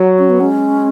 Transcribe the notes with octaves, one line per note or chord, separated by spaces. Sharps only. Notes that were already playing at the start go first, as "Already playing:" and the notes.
Already playing: F#3
C#4
B3
G#3 C#4